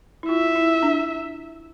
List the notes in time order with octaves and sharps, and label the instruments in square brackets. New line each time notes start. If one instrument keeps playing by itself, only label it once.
[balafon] E4
[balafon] F4 [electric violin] E5
[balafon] E4
D4